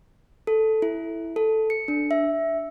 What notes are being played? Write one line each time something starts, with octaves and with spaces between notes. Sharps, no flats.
A4
E4
A4
C#7
D4
E5